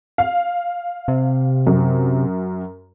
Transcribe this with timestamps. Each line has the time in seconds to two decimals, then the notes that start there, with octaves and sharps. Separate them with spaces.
0.18 F5
1.08 C3
1.67 F#2